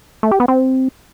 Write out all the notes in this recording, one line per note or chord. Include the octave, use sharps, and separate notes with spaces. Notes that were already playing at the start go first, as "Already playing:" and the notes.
A3
G4
B3
C4